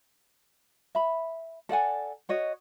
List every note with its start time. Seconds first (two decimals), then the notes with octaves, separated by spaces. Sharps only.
0.95 E5 B5
1.69 A4 D5 F#5 G#5
2.29 F#4 C#5 D#5